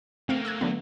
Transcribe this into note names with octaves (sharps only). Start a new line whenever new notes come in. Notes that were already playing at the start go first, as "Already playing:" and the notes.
A3 A#3 C4 F5 D7
E6 F#6 G#6
D3 F#3 B3